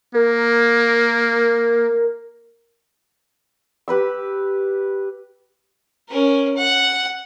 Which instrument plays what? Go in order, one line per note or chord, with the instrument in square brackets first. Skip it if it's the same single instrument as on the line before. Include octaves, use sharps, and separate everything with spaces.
[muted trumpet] A#3 [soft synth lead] A#4
[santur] G4 B4 B5 E6
[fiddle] C#4 A#4
F#5